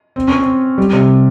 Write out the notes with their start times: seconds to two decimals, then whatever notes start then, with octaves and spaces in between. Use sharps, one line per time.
0.16 C4
0.28 C#4
0.40 C4
0.78 G3
0.93 C3